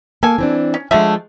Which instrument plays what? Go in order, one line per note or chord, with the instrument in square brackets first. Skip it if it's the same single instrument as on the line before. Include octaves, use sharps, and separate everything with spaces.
[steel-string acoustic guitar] A#3 [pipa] A4 G#5
[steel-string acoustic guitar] E3 C4 D4
[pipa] C#4
[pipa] D3 A3 E5 [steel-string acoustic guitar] F3 G#3